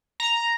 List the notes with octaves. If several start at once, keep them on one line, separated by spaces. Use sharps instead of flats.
A#5